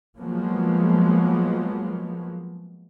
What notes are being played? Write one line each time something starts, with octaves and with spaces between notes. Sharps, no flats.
F3 F#3 G#3 A#3 B3